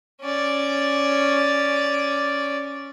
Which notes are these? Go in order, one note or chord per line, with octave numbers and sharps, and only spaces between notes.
C#4 D5